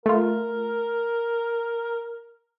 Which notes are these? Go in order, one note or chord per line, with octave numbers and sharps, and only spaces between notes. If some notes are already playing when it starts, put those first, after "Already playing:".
A3 F4 A#4